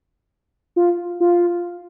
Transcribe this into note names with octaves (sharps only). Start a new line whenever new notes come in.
F4
F4